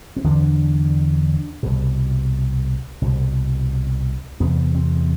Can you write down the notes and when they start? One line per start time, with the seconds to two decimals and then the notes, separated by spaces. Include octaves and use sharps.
0.16 C4
0.24 E2 D3 D4
1.63 C2 B2
3.02 C2 B2
4.40 E2 C3 B3
4.75 C4